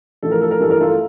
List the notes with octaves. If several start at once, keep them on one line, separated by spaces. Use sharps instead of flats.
A1 A2 F3 A4
A#4
A4
A#4
A1 G2 E3 G3 A4
A#4
F4 A4